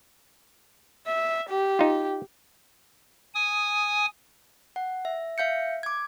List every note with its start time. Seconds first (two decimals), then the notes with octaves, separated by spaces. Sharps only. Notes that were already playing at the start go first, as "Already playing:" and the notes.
1.07 E5
1.49 G4
1.79 D#4 F4
3.34 G#5 D#6
4.76 F#5
5.05 E5
5.38 E5 F5 G6 C#7
5.83 D6 G#6